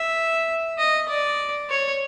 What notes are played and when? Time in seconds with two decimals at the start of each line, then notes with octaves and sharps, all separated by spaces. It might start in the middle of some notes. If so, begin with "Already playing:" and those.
Already playing: E5
0.78 D#5
1.08 D5
1.69 C#5